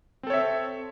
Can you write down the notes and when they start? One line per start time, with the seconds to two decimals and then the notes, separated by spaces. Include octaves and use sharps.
0.23 C4
0.27 A4
0.30 C#5
0.33 E5